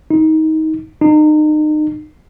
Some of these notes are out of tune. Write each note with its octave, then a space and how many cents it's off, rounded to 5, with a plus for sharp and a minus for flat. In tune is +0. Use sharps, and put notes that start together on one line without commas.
D#4 +20
D#4 -35